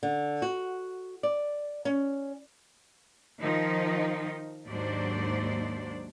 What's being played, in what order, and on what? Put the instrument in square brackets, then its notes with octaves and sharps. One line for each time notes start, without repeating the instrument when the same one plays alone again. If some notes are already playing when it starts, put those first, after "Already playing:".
[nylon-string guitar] D3
F#4
D5
C#4
[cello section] D#3 F3 D#4
D#2 G#2 F#3 D4 C5 D5